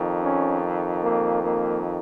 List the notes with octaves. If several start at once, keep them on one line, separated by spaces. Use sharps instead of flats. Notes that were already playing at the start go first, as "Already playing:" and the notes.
Already playing: F2 D#3
C#4
A#3
A#3